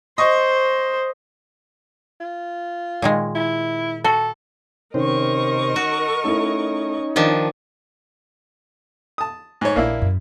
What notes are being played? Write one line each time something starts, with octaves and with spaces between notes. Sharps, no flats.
C5 D#5 C#6
F4
A#2 D#3 G#3
E4
F#4 A4
C3 D#3 C#4 A#4 C5 D#5 C#6
F#4
A3 C#4 D#4 E4
D#3 F3 D4 D#5
A5 D#6
G#2 C#5
A#1 A#3 D4 E4
F#2